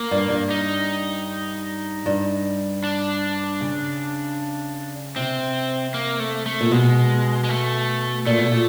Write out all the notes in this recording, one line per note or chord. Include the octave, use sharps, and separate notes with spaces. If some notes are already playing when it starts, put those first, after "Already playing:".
Already playing: A#3
G2
G2
D#4
G2
D4
C#3
C3 C4
A#3
A3
A3
A#2
B2 G#3
G#3
A3
A#2 A3
B2
A#2